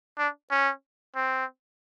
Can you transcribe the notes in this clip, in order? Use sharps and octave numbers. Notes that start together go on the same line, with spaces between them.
D4
C#4
C4